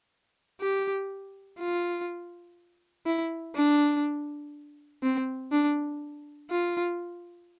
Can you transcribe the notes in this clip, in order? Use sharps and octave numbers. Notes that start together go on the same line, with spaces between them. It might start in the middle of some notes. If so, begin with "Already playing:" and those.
G4
F4
E4
D4
C4
D4
F4